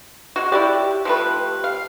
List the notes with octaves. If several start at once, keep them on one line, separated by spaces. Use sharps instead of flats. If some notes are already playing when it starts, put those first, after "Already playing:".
G#3 F#4
E4 F#4 G4 D5
F3 A3 B4
F5